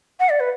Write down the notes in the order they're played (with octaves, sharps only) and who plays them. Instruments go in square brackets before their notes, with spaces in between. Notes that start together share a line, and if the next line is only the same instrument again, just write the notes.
[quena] F#5
D5
B4